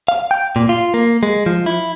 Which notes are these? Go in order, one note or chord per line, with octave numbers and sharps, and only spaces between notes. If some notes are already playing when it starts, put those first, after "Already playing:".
F5
G5
A#2
F4
A#3
G#3
F3
E4